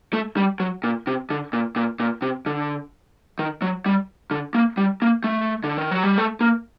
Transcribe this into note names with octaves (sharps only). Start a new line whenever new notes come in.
A3
G3
F#3
A#2
C3
D3
A#2
A#2
A#2
C3
D3
D#3
F#3
G3
D3
A#3
G3
A#3
A3
D3
D#3
F#3
G3
A3
A#3